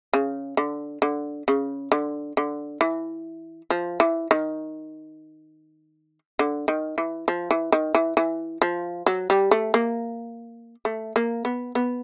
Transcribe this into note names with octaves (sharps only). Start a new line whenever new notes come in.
C#3
D3
D3
C#3
D3
D3
E3
F3
E3
D#3
D3
D#3
E3
F3
E3
D#3
E3
E3
F3
F#3
G3
A3
A#3
A3
A#3
B3
B3